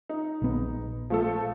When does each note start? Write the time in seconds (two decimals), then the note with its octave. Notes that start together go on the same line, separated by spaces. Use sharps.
0.09 D#4
0.42 A#1 B3
1.10 F3 A3 A4